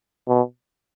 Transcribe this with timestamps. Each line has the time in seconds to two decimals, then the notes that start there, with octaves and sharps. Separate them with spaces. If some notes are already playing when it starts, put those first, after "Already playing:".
0.28 B2